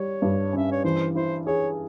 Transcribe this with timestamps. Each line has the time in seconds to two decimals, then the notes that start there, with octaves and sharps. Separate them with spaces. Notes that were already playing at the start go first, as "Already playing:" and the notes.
Already playing: G3 C#5
0.22 G2
0.53 C#4 E5
0.71 C#5
0.84 E3 C5
1.15 E4 C5
1.46 G#4 C#5